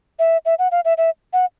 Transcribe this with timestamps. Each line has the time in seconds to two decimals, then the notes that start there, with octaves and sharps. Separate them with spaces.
0.19 E5
0.45 E5
0.59 F#5
0.71 F5
0.85 E5
0.98 E5
1.33 F#5